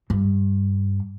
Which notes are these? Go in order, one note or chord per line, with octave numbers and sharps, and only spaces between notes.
G2